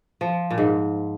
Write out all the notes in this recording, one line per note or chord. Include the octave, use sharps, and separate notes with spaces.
F3
A#2
G#2